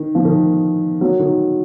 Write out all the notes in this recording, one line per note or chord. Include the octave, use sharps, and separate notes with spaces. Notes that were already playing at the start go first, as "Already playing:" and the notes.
Already playing: D#3
F3
D#3
F#3
D#3